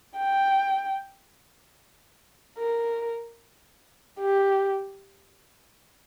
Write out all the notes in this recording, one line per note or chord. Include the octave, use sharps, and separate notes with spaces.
G5
A#4
G4